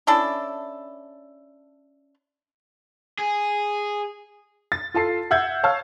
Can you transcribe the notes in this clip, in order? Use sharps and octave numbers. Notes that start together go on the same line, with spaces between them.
C#4 D4 E4 A4
G#4
A6
F4 A4 A5 C7
E5 F#5 E6 G6 G#6
C#5 F5 A5 E6 F6